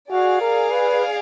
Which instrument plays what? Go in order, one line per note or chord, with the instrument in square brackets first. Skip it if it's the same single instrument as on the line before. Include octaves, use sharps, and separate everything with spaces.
[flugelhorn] F#4 [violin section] G#4 D5 F5
[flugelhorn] A#4
B4